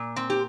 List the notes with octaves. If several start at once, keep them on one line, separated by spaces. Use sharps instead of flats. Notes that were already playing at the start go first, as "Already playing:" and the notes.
Already playing: A#2
C4
G4